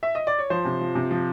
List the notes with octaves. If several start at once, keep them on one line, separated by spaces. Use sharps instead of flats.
E5
D#5
D5
C#5
F3 C5
C3
F3
C3
F3